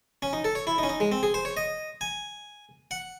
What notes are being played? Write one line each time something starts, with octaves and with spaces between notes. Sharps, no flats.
C#4
D#4
A4
C#5
E4
D#4
C#4
D#4
G#3
C4
G#4
C5
C#5
D#5
G#5
F#5